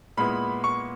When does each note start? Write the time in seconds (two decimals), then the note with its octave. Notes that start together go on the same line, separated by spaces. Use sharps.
0.17 A#2 G#3 B3 E4 B5
0.64 C#6